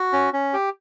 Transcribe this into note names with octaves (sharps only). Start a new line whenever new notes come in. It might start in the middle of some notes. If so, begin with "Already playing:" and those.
Already playing: F#4
C#4
C#4
G4